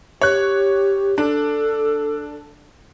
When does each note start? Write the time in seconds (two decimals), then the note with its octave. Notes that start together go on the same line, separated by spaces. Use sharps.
0.21 G4 C#5 F#6
1.18 D4 A4